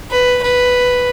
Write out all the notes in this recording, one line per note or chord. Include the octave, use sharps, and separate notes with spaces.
B4
B4